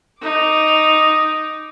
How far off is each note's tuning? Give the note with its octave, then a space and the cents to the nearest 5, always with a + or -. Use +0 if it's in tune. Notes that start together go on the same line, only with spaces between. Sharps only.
D#4 +0 D6 +0